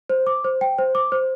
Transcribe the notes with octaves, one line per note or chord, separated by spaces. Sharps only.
C5
D6
C5
G5
C5
D6
C5